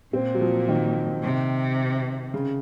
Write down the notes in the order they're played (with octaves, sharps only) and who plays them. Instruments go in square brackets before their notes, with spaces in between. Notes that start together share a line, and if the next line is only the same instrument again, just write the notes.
[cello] A#2 [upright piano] C4
[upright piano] F#3
F3
D#3
[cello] C3
[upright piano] C#3